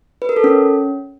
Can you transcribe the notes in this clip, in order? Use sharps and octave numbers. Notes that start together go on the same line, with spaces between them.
B4
A#4
A4
C#4